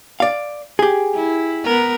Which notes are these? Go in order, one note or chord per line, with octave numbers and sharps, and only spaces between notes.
D5 F5
G4 G#4
E4
B3 A#4